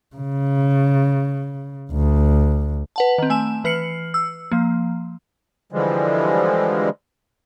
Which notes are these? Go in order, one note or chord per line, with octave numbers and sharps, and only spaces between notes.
C#3
D2
B4 F#5 A5
D#3 C4
A3 G#5 E6 E7
E3 B4 F6 C7 C#7 F#7
E6
F3 A#3
D3 E3 F3 G3 G#3